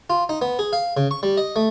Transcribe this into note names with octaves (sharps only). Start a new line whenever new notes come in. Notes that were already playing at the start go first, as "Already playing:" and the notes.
F4
D#4
B3
G#4
F5
C#3
C#6
G3
D#5
A3